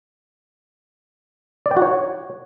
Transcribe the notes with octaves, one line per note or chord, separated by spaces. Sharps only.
D5
G5
F#4
C#5